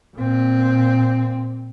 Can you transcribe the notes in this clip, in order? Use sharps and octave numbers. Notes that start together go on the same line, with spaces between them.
A#2 C4